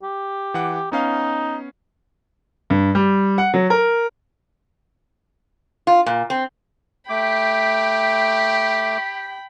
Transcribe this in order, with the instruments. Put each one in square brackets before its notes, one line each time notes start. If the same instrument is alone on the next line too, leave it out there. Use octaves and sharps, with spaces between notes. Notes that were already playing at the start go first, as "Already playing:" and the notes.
[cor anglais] G4
[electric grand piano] E3 F#5 D6
[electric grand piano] B3 C#4 F5 [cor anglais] D#4
[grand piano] G2
G3
F#5
F#3
A#4
[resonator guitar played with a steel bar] F4
A#2
C4
[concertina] A3 D6 [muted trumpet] G4 [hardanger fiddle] G5 B5